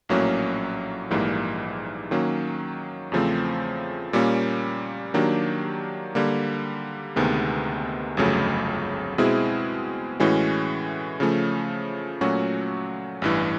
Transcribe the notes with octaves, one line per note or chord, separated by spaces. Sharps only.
A#1 A2 F#3 A#3 C#4
A#1 G#2 E3 G3 A#3
D#3 F#3 A#3 C#4
E2 C#3 F3 A3 C4
A#2 G3 A#3 C#4
D#3 F#3 A#3 D4 G4
D3 G3 A#3
D2 C3 D#3 G#3 B3
G1 F2 C#3 F#3 A3
B2 G#3 C4 E4 G#4
A2 E3 G#3 C#4 F#4
C#3 F3 A3 C#4
A#2 F#3 A3 C#4 F#4
A1 G2 E3